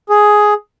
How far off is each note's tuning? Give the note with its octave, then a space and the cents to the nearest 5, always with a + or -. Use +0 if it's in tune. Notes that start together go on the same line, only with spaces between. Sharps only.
G#4 +5